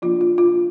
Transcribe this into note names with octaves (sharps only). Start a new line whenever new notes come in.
F3 A#3 D4 F4
F4
F4